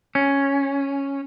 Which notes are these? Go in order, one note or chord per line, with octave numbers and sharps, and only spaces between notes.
C#4